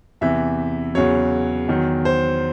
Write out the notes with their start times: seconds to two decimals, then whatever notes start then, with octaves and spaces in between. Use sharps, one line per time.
0.21 E2 C3 E3 E5
0.95 E2 C#3 F#3 C#5
1.68 E2 D#3 F#3
2.05 C5